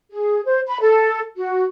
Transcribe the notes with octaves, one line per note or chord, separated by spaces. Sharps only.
G#4
C5
B5
A4
F#4